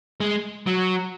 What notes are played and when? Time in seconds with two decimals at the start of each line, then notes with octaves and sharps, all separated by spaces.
0.20 G#3
0.67 F#3